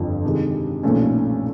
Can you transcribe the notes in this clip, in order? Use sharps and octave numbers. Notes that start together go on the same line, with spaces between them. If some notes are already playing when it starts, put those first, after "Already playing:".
Already playing: G1 F2 F3
C3 D#3 G#3
B1 A#2 F3 A3 C#4